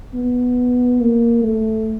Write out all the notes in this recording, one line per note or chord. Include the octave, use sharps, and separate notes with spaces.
B3
A#3
A3